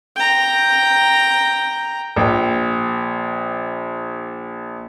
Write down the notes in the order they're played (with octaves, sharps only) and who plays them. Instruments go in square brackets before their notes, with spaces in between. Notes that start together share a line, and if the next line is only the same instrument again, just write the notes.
[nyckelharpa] G5 A#5
[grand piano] A#1 G5